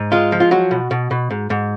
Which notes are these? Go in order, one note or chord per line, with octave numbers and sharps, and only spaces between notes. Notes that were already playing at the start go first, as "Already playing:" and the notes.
Already playing: G#2
G#3 F4
F3
F4
F#3 F#4
B2
B2
B2
G#2
G#2